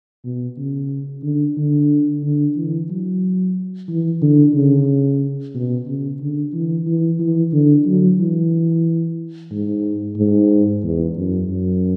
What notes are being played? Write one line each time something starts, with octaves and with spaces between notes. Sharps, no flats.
B2
C#3
D3
D3
D3
E3
F#3
E3
D3
C#3
B2
C#3
D3
E3
E3
E3
D3
F#3
E3
G#2
G#2
E2
F#2
F#2